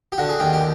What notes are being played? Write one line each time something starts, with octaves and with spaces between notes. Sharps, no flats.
G4
D3 F#4
G#4
D#2 G4
G4